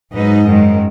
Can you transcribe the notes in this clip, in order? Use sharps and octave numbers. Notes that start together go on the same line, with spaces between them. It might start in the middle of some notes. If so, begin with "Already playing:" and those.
G#2 F#3 D#4 B4 D#5
F#2 D#3 G#3